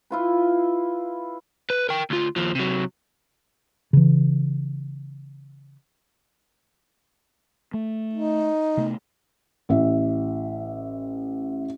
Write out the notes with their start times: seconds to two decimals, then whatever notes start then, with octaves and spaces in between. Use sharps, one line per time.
0.10 E4 F4 B4
1.70 B4
1.89 A#4 G5
2.10 D2 F4
2.36 D#2 F3
2.55 C3 F#3
3.93 C#3 E3
7.74 A3
8.13 D#4
8.77 C3 A3 B3
9.69 A1 E4 E5